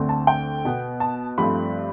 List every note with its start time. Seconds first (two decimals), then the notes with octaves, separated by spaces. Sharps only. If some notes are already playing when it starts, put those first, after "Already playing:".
Already playing: D2 D3 A3 C4
0.09 A5
0.27 G5
0.65 B2 B3
1.00 A5
1.38 G2 F3 A3 C4 B5